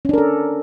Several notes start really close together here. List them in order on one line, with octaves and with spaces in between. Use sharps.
C#4 D4 A#4 A4